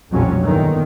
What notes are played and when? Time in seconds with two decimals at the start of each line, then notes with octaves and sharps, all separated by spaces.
0.10 B1 F2 A#2 F#3 G3 C#4
0.42 E2 G2 A#2 D3 D#3